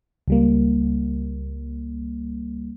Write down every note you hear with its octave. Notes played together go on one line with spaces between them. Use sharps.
C#2 G3 A#3